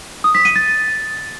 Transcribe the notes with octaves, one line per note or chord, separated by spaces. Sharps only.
D#6
B6
D#7
A6